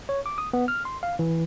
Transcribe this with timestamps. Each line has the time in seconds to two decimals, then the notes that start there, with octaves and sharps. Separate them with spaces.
0.09 C#5
0.26 D6
0.38 D#6
0.53 B3
0.68 F6
0.85 C6
1.03 F5
1.19 E3